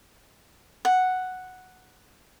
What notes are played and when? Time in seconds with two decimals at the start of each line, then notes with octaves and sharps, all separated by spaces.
0.85 F#5